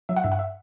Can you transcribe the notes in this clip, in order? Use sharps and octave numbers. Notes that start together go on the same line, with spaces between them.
F#3 E5
F#5
G2 E5
F#5
E5